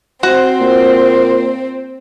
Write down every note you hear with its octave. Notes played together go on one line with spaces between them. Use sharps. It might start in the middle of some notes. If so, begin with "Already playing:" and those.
C4 F#4 C5 F#5
A#2